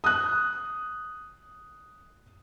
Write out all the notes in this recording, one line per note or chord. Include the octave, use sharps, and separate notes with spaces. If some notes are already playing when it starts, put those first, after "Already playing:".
D#6 F#6